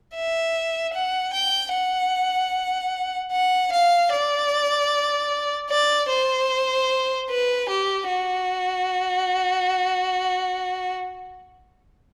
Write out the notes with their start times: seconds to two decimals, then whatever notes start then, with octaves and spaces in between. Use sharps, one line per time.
0.16 E5
0.94 F#5
1.33 G5
1.74 F#5
3.32 F#5
3.72 F5
4.12 D5
5.70 D5
6.10 C5
7.30 B4
7.69 G4
8.08 F#4